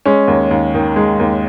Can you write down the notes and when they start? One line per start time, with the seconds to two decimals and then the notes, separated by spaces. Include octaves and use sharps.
0.05 G#3 C#4
0.28 D#2
0.51 D#2
0.74 D#3
0.96 G#3
1.19 D#2